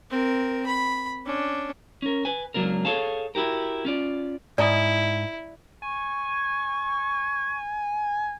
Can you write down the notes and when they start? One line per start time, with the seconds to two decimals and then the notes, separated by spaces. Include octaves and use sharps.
0.11 C4 A#4
0.66 B5
1.26 C#4 D4
2.02 C#4 A#4
2.25 B4 G#5
2.54 C#2 C#3 F#3 A#3 D4 A#4
2.85 G#4 A4 C#5 F5 A5
3.35 E4 F#4 G4 A#4
3.85 C#4 F4 D5
4.58 G#2 E4 D5 A#5 D#6
5.82 G#5 C#6